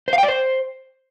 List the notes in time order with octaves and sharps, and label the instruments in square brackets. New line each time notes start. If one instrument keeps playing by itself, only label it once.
[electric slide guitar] C5
F5
G5
D5
C5